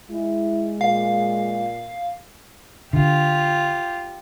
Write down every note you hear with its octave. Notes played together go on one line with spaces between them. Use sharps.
G#3 E4
A#2 F5
D3 F4 G4